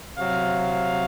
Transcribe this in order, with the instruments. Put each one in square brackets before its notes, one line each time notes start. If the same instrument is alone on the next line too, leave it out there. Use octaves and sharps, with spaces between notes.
[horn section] C3 F#3 F5